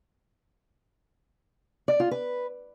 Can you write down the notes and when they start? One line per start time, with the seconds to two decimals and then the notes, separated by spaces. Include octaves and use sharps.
1.88 D5
2.00 F4
2.11 B4